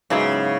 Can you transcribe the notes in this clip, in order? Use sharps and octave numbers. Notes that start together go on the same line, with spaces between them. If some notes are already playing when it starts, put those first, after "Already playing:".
G#2 C#3 F#3 B3 E4